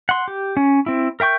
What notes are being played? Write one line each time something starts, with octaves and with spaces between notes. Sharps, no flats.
F#5 C6
G4
C#4
C4 E4
A#4 E5 G5 C#6 G6